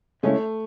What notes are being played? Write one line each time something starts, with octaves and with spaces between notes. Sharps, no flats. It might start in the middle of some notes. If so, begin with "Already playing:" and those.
C#3 G#3 A3 C#4 E4